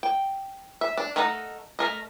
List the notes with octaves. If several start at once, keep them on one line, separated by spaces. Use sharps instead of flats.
G5
E5
D4
A3 D#4 A#4 D#5 F#5
A3 A#4 D#5